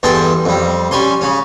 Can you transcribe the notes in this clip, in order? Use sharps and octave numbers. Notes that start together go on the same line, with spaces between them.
E2 G2 G#4 A4 G5 C6
F2 G3
G3 C#4 G#5 C6
C#3 C#4